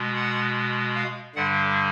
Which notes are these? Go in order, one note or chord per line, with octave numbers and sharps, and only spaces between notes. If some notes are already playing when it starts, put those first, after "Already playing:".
Already playing: B2 G#3
F#5
F5
G2 D3 G3 F#5